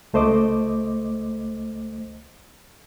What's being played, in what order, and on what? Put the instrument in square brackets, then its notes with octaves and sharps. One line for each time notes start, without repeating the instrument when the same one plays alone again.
[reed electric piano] C#2 A3 C5 D#5 D6